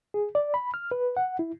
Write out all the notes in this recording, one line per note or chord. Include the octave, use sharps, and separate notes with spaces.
G#4
D5
B5
F6
B4
F#5
E4